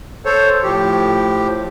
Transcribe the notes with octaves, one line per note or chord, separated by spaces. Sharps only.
A4 C5 C#5
A2 F3 G4